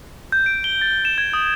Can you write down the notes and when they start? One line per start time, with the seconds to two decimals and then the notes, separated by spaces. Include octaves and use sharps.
0.32 G6
0.46 D7
0.64 G7
0.81 A6
1.05 E7
1.18 G#6
1.33 D#6